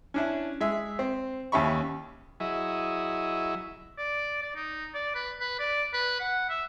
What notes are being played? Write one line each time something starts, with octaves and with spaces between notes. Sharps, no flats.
C#4 D4 E4
G#3 E5
C4
D#2 C#4 G4 E5 B5 C#6
F#3 E4 G#4 D#5 E5
D5
D5
D#4
D5
B4
B4
D5
B4
F#5
E5